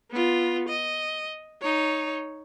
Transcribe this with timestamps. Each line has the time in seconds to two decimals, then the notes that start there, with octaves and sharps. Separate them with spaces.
0.11 B3 F4
0.69 D#5
1.61 D#4 C#5